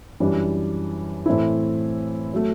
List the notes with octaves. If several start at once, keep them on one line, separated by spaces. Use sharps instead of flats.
F#2 E3 G3 D4
A2 E3 A3 C4 E4
F#3 A3